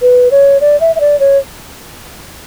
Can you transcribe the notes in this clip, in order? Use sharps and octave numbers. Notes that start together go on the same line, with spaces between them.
B4
C#5
D5
E5
E5
D5
C#5